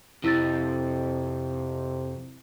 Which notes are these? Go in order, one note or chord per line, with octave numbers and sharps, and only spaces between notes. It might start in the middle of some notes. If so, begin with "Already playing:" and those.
F2 C3 E4 E6 A6